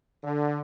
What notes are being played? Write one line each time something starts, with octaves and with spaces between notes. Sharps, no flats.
D3